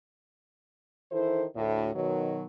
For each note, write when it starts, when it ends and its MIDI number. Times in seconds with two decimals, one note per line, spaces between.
1.11 1.45 51
1.11 1.45 52
1.11 1.45 64
1.11 1.45 69
1.11 1.45 72
1.55 1.90 38
1.55 1.90 45
1.95 2.46 47
1.95 2.46 51
1.95 2.46 54